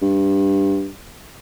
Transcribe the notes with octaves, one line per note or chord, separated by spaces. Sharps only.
G2